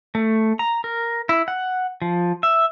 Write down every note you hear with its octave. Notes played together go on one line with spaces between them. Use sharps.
A3
A#5
A#4
E4
F#5
F3
E5